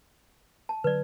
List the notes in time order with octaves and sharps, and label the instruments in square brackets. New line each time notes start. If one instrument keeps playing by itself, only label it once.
[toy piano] A5
[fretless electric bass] D3 F#3 [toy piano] B4 D5